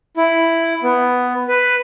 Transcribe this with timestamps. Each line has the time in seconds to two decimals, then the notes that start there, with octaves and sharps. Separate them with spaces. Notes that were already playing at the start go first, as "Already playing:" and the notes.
0.17 E4
0.83 B3
1.48 B4